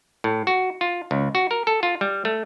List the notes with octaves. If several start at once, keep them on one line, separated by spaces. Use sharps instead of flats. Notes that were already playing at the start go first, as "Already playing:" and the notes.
A2
F#4
F4
C#2
F#4
A#4
A4
F4
G3
A3